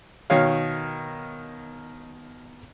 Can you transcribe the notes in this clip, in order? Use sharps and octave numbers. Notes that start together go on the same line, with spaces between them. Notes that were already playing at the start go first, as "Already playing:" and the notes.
B2 D#3 C#5 F5